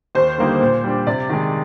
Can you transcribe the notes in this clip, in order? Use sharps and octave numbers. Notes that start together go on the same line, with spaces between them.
D#2 C5
D3 G3 A#3 D#4
A#2
G3 D4
C3 D5
D#3 G#3